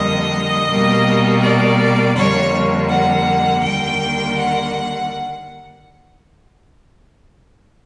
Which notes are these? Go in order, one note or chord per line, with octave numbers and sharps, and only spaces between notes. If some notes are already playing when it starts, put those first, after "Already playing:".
Already playing: F2 D3 G3 A#3 D#5
B2 G3 A#3
D5
F2 D3 G3 A#3 C#5
F#5
D#2 D3 G3 A#3 G5
F#5